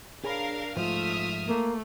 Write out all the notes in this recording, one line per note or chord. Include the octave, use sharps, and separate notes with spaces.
D4 G#4 A#4 C#5 F5 B5
G#2 F3 A3 F4 C5 E5 D#6 F6
A3 A#3